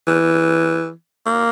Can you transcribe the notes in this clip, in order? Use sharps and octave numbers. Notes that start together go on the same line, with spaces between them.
E3
A#3